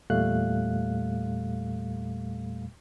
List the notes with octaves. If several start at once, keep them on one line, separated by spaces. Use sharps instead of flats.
E2 A#2 G3 A3 F5 F#6